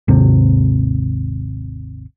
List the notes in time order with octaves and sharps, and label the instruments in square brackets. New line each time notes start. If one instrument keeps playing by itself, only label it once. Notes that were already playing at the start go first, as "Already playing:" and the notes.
[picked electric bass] G#1 D#2 C3